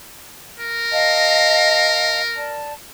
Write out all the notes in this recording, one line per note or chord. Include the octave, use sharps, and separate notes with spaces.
A#4
D#5 F5 A5
D5 A5